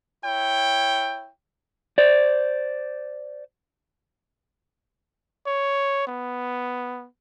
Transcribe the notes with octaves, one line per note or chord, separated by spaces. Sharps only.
E4 C#5 G5
C5 D5
C#5
B3